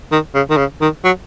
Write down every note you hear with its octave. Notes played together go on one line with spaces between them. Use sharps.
D#3
C#3
D#3
C#3
D#3
F#3